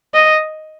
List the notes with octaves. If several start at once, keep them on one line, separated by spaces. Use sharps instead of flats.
D#5